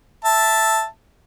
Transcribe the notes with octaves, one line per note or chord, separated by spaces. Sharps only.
E5 A5